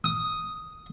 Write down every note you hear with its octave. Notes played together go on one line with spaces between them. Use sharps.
D#6